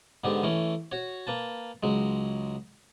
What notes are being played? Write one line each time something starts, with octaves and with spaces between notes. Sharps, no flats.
G#2 D3 B3 G4
E3 A3 C#4
F#4 C#5
A#3 B4 A5
C#2 F#3 G#3